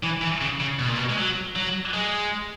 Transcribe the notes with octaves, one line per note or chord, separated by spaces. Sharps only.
E3
E3
C#3
C#3
B2
A#2
B2
G#3
F#3
F#3
G#3